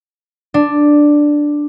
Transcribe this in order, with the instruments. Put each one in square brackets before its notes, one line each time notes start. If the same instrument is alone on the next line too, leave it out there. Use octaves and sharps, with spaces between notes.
[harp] D4